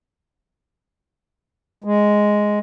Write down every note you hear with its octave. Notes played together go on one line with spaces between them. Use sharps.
G#3